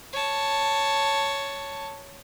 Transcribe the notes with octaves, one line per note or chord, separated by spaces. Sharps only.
C#5 A5